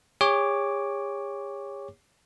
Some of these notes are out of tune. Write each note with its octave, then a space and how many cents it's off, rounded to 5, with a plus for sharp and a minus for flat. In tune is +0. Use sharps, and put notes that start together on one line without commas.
G#4 -45 C#5 +0 D6 +0